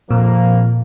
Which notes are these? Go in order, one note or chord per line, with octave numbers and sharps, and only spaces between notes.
F2 A#2 F3 A#3